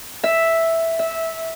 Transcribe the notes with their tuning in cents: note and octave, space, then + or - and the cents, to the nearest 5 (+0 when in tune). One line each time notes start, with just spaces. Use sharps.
E5 +0
E5 -15